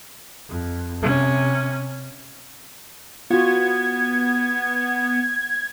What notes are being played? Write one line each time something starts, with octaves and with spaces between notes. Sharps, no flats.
F2
C3 C#4
B3 F4 F#4 G#6